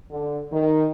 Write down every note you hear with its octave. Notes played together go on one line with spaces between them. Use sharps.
D3
D#3